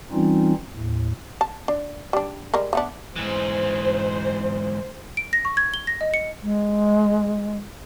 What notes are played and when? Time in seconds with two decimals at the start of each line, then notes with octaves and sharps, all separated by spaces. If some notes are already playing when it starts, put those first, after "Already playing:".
0.12 E3 G3 C4 C#4 D#4 F4
0.74 D#2 A2
1.41 A5
1.68 D4
2.13 G3 D4
2.54 G3 G#3 A#4
2.73 A3 B3 D4
3.16 G#2 E3 C5
5.17 D7
5.33 A#6
5.45 C#6
5.57 G#6
5.74 G7
5.87 A#6
6.01 D#5
6.14 C#7
6.41 G#3